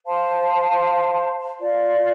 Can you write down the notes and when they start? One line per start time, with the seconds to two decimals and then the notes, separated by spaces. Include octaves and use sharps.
0.05 C5 F5 A5 C6
1.59 F4 D5 F5